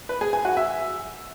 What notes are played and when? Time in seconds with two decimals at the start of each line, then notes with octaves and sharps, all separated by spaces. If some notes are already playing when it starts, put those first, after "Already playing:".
0.09 B4
0.21 G#4
0.33 G#5
0.45 F#4
0.57 E5